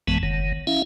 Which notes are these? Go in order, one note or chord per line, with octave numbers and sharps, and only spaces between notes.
A#1 F#2 E3 G#3 B3 A5
F#1 D#3
C#4 E4 E5 F5